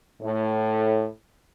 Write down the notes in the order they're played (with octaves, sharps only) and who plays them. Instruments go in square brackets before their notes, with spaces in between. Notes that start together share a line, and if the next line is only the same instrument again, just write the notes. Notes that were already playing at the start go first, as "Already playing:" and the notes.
[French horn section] A2